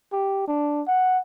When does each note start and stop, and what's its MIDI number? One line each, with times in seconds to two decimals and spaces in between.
0.13 0.45 67
0.48 0.82 62
0.88 1.19 78